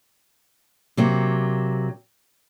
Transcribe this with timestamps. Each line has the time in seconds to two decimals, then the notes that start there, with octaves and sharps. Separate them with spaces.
0.97 C3 F#3 A#3